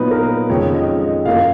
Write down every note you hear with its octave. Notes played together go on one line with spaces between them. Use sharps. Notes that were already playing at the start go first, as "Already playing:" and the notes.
Already playing: A#2 F#3 B3 D#4 B4
A#4
F2 D#3 G#3 C#4 C#5
D#5
D#5
F#2 F3 A#3 F5